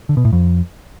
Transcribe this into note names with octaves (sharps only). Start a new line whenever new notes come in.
D3
B2
A2
F2